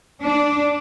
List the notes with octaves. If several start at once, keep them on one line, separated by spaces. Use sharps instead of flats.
D4